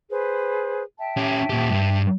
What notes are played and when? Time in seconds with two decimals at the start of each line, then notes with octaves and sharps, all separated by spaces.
0.10 G#4 B4 C5
0.99 E5 G5 A5
1.17 C#4 G4
1.50 A#2 G4
1.70 G2